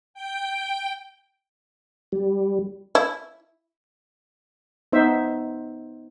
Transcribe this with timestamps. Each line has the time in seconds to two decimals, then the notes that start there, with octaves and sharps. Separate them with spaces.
0.14 G5
2.12 G3
2.95 E4
4.93 B3 D#4 C5 E5